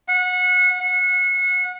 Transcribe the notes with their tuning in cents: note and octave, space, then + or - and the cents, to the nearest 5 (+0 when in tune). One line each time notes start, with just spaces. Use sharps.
F#5 -25
F#5 -30